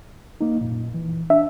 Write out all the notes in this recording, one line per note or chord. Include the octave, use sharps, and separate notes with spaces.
A#3 D#4
F#2 A#2
E3
D4 E5